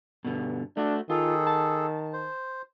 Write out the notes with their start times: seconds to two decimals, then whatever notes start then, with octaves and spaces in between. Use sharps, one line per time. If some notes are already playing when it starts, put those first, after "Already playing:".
0.25 G2 B2 D3
0.77 A3 D4 F#4
1.10 D#3 F4 G#4 A4
1.47 A5
2.13 C5